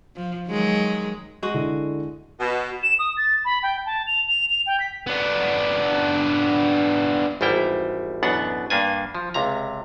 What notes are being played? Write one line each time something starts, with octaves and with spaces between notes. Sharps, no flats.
F3
D#3 F#3 G#3
G#3 F#4 D#7
D3 E4
B2
E7
D#6
A6
B5
G5
A5
F7
F7
F7
G5
B6
B3 D4
G#1 E2 G3 E4 G5
A1 F#2 B2 B3 D4 F#5
G2 A#3 D4 G#5
F3
C#2 C3 A#5